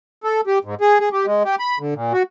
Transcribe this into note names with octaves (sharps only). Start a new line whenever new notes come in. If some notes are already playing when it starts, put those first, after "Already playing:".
A4
G4
G#2
G#4
G#4
G4
G#3
G4
B5
D3
A#2
F#4